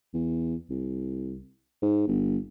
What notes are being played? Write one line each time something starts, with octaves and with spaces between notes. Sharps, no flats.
E2
C2
G#2
G1